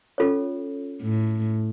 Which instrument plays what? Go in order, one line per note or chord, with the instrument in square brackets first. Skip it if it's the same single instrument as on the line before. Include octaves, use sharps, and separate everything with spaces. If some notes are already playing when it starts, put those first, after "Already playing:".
[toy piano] C#4 F4 A4 C#5
[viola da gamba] A2